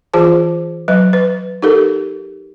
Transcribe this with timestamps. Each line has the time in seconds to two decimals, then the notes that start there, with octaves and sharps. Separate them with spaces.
0.14 E3 F4 G#4 C5 A5
0.88 F#3 B4 D#5
1.13 B4
1.62 D#4 G4 A4 A#4